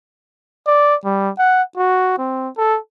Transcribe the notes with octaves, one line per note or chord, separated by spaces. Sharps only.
D5
G3
F#5
F#4
C4
A4